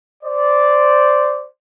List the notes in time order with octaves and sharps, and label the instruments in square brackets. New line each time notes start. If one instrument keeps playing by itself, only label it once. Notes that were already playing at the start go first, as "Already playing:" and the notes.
[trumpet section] C5 D5